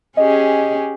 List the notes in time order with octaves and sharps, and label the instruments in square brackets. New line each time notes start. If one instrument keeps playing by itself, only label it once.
[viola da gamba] C#4 G4 G#4 [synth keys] D#5